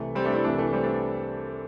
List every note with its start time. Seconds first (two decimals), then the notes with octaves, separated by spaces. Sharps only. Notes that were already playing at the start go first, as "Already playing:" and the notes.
Already playing: C2 C3 E3 A3
0.15 G3 C4
0.24 A3 D4
0.34 C4 E4
0.44 C2 C3 E3 A3 D4
0.58 E3 A3
0.73 G3 C4
0.83 A3 D4